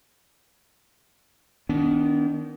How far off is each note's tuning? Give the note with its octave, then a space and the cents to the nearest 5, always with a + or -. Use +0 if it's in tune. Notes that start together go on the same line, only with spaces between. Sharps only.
D#3 +0 B3 +0 D4 -35